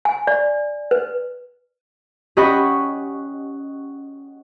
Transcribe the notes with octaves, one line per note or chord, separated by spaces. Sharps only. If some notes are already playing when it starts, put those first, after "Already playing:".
G#5
D5
B4
C#4 G4 D#5 F#5 B5 C#6